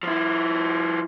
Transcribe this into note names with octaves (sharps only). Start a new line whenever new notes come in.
F3 E4